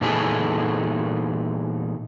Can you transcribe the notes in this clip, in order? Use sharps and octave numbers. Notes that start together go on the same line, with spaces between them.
A#2 E3 B3 D#4 G#4 A4